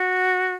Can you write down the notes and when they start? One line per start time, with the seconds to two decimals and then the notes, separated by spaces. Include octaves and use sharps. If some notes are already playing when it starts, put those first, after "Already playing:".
Already playing: F#4